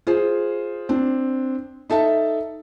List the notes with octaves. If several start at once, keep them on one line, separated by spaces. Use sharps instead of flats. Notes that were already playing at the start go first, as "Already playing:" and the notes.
F4 G#4 C5
C4 D4
D#4 A4 E5 A5